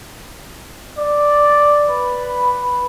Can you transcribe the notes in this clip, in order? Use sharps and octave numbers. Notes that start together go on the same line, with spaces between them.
D5
B4